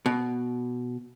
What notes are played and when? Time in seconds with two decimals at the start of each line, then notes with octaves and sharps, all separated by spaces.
0.06 B2